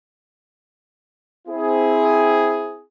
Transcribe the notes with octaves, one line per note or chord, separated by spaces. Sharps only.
C4 E4 G#4